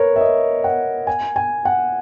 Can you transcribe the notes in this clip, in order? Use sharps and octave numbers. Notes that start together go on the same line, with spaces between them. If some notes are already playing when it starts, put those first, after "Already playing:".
Already playing: A#4 B4 C#5
E5
D#5
F#5
G#5
G#5
F#5